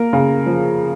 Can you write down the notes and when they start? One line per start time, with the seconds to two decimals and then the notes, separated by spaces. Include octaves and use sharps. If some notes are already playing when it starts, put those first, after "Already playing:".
Already playing: A#3 A#4
0.13 C#3
0.46 F3